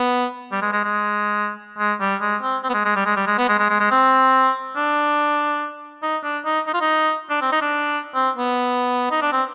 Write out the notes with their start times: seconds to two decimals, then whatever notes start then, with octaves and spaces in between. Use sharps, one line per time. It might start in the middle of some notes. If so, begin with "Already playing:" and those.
Already playing: B3
0.52 G3
0.62 G#3
0.73 G#3
0.84 G#3
1.78 G#3
2.00 G3
2.21 G#3
2.42 C4
2.64 C4
2.69 B3
2.74 G#3
2.85 G#3
2.96 G3
3.06 G#3
3.16 G3
3.27 G#3
3.38 B3
3.49 G#3
3.59 G#3
3.69 G#3
3.80 G#3
3.91 C4
4.76 D4
6.02 D#4
6.24 D4
6.45 D#4
6.67 D#4
6.74 F4
6.81 D#4
7.30 D4
7.41 C4
7.52 D#4
7.62 D4
8.15 C4
8.36 B3
9.11 D#4
9.22 D4
9.32 C4